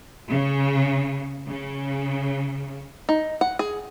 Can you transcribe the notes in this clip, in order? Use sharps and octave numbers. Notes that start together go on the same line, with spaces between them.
C#3
C#3
D#4
F#5
G#4